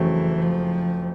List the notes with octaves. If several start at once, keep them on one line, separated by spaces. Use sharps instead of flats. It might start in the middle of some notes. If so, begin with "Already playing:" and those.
Already playing: F#1 F2 C#3 E3 F#3 A3
F3